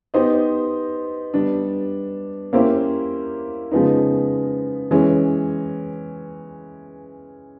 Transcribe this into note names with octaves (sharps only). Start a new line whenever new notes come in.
B3 D#4 G4 C5 D#5
G3 B3 D4
A#3 C#4 E4 G4 C5
C#3 F3 G#3 B3 D#4
E3 G#3 C#4